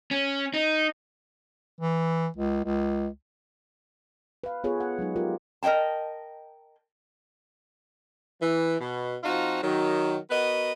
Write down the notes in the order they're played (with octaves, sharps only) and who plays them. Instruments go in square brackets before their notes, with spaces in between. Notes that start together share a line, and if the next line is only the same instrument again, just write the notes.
[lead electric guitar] C#4
D#4
[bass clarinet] E3
C#2
C#2
[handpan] B4 F5
B3 F4 G#4 A4 B4 C#5
F#5
F#3 G#3 D#4
F4 G4 A#4
[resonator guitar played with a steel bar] A#4 D#5 E5 G5 A5
[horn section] E3
B2
F3 C4 D#4 F4 F#4
D#3 F#3
B3 F#4 A#4 B4 D#5